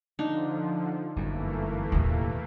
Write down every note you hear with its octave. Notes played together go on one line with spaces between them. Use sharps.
D3 F3 D4 D#4
G1 F#2 E3 A3 A#3
D1 D#2 B2